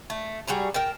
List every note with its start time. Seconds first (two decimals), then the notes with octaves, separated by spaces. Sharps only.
0.10 A3
0.48 G3 F#4 G#4 A#5
0.74 A#4 G5 A5